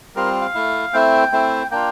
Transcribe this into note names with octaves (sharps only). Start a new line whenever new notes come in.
G3 C4 F4 A#4
F5
A3 E4
A3 C4 E4 G5
A3 C4 E4
A#3 D4 F4 G5